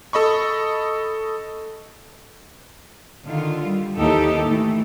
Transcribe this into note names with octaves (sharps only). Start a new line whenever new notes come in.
A4 D#5 B5 C#6
D3 D#3 F4
G3
D#2 E3 D#4 G4 A4
E3 A3